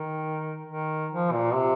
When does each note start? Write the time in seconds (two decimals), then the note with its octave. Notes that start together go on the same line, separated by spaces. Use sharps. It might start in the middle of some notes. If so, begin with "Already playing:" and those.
Already playing: D#3
0.67 D#3
1.11 F3
1.33 A#2
1.54 C3